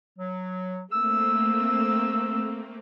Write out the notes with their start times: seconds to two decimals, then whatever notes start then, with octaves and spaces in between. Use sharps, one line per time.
0.19 F#3
0.92 A3 A#3 C4 E6